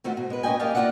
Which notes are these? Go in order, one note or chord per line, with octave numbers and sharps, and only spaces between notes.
D#3 A3 C4 F4 F#4
B2
G#3 B4
A#3 C#4 B4 D#5 G5 G#5
F2 A#3 G4 D#5 F5 A5
A#3 D#4 F4 D5 E5 F#5